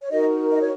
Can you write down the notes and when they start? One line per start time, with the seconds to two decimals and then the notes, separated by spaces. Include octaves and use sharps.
0.02 C#5
0.12 D#4 F#4 A#4 D#5
0.51 D#5
0.61 C#5